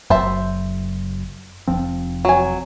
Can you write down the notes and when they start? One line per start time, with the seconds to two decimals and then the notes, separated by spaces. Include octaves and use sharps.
0.10 F#1 F#2 F#3 C5 E5 A5
1.67 F1 F3 C4
2.25 F#3 G#5